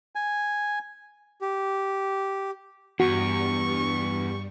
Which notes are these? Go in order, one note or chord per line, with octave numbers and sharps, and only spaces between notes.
G#5
G4
E2 G2 G3 F#4 C#6